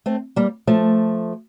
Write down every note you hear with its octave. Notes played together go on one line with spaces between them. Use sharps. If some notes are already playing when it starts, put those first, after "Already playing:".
A3 C4
G3 A#3
F3 A3